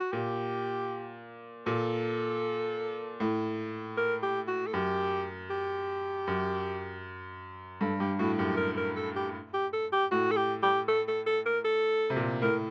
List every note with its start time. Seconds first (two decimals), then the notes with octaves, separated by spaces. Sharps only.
0.01 F#4
0.13 A#2 G4
1.66 A#2 A4
3.20 A2
3.97 A#4
4.23 G4
4.48 F#4
4.67 A4
4.73 F#2 G4
5.50 G4
6.27 F#2
7.81 G2 A4
8.00 G2 G4
8.19 A2 F#4
8.39 F#2 G4
8.57 A#4
8.77 A#4
8.96 A4
9.16 G4
9.54 G4
9.73 A4
9.92 G4
10.12 A2 F#4
10.31 A4
10.37 G4
10.63 G4
10.88 A4
11.08 A4
11.27 A4
11.46 A#4
11.65 A4
12.10 C3
12.16 A#2
12.42 A2 A#4